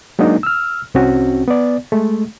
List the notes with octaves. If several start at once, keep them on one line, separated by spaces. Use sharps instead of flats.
F#3 G#3 A#3 D4 D#4
E6 F6
C2 C4 C#4 F#4
B3 D5
G#3 A3